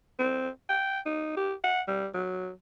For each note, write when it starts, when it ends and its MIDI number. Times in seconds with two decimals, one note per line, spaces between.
0.19 0.49 60
0.69 0.99 79
1.06 1.33 63
1.37 1.53 67
1.64 1.81 78
1.88 2.07 55
2.14 2.51 54